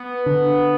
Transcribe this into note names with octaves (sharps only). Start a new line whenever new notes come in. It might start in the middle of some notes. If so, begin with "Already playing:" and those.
Already playing: B3
D3